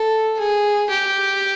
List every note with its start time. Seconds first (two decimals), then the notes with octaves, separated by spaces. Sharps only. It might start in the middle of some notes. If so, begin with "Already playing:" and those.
Already playing: A4
0.39 G#4
0.90 G4